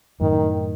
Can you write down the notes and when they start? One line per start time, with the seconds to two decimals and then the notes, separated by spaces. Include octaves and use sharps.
0.21 F#2 A2 D#3